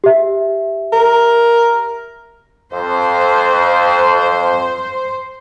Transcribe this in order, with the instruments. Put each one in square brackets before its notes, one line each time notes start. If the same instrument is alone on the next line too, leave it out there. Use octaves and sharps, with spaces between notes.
[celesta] G4 E5
[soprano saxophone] A#4
[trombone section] F2 [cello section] C5